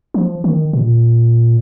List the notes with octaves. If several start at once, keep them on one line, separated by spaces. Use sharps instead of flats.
F3
D#3
A#2